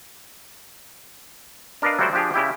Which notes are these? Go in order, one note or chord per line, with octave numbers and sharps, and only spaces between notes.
D4 A#4 B4 D5 D#5 F5
F#3 G3 A3 F#4 C5 D5
F3 D4 G4 G#4
C#3 E4 G4